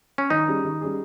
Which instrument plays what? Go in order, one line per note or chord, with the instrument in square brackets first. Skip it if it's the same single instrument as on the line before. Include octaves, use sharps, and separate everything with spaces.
[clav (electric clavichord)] C#4
[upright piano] D#3 [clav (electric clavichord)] D#4
[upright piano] G3 C#4 G#4
D#3
G3 C#4 G#4